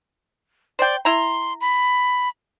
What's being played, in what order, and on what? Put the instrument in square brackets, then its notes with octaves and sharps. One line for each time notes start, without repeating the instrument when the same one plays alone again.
[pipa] C5 G5 [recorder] D5
[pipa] E4 A#5 [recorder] C6
[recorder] B5